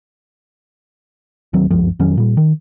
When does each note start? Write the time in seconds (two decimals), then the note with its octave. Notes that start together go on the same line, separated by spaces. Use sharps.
1.53 D1 D#3 F#3 C4
1.71 G1 C#2 F#2 F3
1.99 F2 D#3 F#3 C#4
2.18 A#2 G3
2.37 D#3